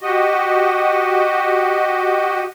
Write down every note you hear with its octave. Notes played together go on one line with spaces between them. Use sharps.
F#4 G4 D#5